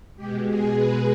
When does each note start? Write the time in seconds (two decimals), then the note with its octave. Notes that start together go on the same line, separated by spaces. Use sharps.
0.16 B2 G#3 G4
0.46 G#4
0.76 B4